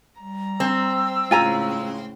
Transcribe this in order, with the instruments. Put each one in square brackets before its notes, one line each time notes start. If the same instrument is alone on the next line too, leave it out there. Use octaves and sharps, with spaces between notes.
[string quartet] G3 A#5
[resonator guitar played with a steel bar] C4 [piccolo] E6
[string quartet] A2 C#3 G#3 [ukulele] F4 G#5 A#5